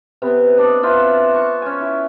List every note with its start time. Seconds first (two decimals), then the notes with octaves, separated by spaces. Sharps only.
0.22 C3 B3
0.58 D4 D5 D#5
0.83 C4 F4 B4 E5
1.34 C#6
1.62 C#4 G#5
1.81 E4